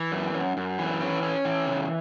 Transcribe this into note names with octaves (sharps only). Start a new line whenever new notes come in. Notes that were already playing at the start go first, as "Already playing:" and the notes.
Already playing: E3
F#2
F#2
F#2
E3
C#4
C#4
E3
C#3